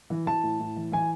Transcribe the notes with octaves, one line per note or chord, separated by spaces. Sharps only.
E3
E3 A5
A2
A2
E3
E3 G#5